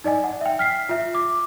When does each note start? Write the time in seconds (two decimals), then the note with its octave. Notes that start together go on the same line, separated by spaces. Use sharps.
0.04 D#4 D5 D#5 G#5
0.24 F#5
0.41 E5 G5
0.59 F6 B6 C7
0.89 F4 E5
1.15 D6